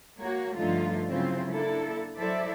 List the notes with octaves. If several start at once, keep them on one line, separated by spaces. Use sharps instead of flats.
A#3 F#4 C#5
G2 D3 F3 A3 D#4 F4
C#3 F#3 C4 E4 F4 C5
A#3 D4 E4 A4
F#3 E4 A4 C5 D5 E5